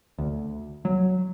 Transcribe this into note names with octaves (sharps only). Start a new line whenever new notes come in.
D2
F#3